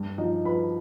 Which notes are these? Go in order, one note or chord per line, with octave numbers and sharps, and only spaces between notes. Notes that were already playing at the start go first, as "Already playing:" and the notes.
Already playing: G2
F3 D#4 D#5
F3 B4 B5